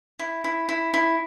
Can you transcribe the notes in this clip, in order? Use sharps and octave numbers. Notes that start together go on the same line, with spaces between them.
E4
E4
E4
E4